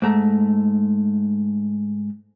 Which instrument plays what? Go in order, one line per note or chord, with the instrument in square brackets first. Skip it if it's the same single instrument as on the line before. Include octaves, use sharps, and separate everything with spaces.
[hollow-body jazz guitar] G#2 A3 A#5